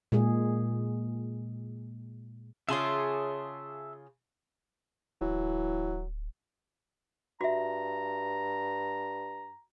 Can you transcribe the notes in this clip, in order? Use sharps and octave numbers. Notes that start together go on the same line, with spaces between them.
A#2 G#3 G#4
C#3 F4 G#4 C#5 E5 A5 C6
D1 E3 F#3
G2 F#4 E5 A#5